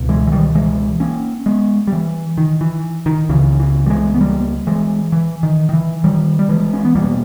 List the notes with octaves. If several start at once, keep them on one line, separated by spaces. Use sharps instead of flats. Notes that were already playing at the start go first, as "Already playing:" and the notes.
Already playing: C#2 B2
E3 G#3
E3
D#3 G3
E3 G#3
A#3 C#4
G#3 B3
G3
E3
D#3
E3
D#3
C#2 C#3 E3
E3
G3
E3 G#3
B3
G3 A#3
E3 G#3
E3
D#3
D#3
E3
D#3 G3
G3
E3 G#3
C#4
B3
E2 B2 G3 A#3